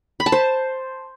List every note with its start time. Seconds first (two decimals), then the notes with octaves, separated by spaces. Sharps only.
0.20 B5
0.26 A5
0.32 C5